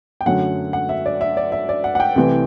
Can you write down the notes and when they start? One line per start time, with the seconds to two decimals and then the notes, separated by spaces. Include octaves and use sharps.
0.21 G5
0.26 F#2 D3 F#3 A3 F#5
0.73 F#5
0.89 E5
1.06 D5
1.21 E5
1.37 D5
1.52 E5
1.69 D5
1.84 F#5
1.95 F#5
2.00 G5
2.16 C2 C3 E3 A3